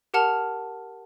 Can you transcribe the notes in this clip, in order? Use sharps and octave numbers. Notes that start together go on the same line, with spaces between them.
G4 A#4 F#5 A5 F6 F7